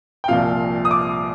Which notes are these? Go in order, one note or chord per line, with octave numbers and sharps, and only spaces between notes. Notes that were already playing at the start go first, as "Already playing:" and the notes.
G5
C2 A#2 F3 F5
D#6
D6